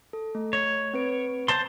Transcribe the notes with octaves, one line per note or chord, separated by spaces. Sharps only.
A4
A3
C#5
C4 B4 D7
C5 A5 C6